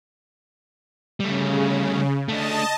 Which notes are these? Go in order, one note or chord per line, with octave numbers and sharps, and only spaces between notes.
C#3 G3 A3
A3 D4 D#5 A5